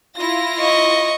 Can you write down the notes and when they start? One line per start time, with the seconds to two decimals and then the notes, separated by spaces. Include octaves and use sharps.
0.16 E4 F4 A#6
0.59 D#5 C#6